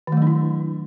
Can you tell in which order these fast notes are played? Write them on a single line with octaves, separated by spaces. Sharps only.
D#3 A3 F#3 D4 E4